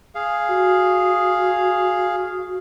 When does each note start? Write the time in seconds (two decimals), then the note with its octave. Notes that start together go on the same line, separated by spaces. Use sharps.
0.15 G#4 F5
0.49 F#4